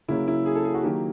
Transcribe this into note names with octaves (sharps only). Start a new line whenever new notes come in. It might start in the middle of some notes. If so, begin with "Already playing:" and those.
C#3 F#3 A#3 C#4 E4
E4
G#4
A4
G#4
F#4
D#3 F#3 A#3 G4